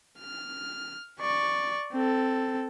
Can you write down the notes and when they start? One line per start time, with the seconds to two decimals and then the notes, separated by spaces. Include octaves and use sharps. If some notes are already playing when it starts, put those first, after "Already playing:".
0.20 F6
1.20 D5 C#6
1.93 C4 A4